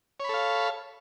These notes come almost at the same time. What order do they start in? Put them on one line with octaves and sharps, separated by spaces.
C#5 B5 A4 F5